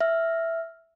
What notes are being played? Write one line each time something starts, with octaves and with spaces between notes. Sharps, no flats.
E5 F6